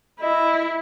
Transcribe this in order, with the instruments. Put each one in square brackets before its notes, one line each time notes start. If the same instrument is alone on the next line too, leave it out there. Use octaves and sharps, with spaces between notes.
[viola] E4 [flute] D#5